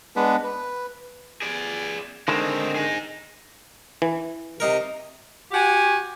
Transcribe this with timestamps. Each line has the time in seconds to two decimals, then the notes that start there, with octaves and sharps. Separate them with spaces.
0.16 G#3 B3 D4 B4
0.44 B4
1.42 G#4 D5
2.28 D3 D#3 G#3 C4 D#4
2.76 D#4 G#4
4.02 E3
4.60 C3 D#4 A#4
5.52 F#4 G4 G#5